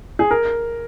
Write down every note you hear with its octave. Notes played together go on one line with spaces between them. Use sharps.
G#4
A#4